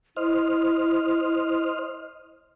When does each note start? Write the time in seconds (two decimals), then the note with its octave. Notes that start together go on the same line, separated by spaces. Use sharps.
0.17 E4 C5 D#5 F6